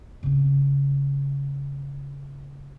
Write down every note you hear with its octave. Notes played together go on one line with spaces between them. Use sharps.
C#3 C4